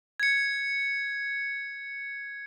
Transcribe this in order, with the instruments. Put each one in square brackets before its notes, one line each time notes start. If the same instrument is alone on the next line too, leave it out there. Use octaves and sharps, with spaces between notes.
[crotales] G#6 C#7